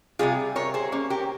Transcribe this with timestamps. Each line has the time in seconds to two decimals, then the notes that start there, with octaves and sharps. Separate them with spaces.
0.19 C3 D#3 G3 F4 G#4
0.56 A#4 C#5
0.74 G#4 C5
0.92 A#3 C#4
1.10 G4 A#4